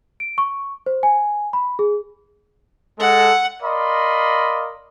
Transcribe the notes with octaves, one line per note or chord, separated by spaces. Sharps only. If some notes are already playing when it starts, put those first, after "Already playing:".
D7
C#6
C5
G#5
B5
G#4
G#3 A4 F#5
A#4 D5 D#5 F5 B5 C6